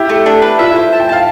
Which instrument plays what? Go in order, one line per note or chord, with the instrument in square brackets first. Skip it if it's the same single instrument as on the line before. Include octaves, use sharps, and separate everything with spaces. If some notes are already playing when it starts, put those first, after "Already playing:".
Already playing: [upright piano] E4 G4
[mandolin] A3
D4
B4
[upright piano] F4 A4 [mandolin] E5
[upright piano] E4
[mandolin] C5
A5
[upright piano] G5
[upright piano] F5 [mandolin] A5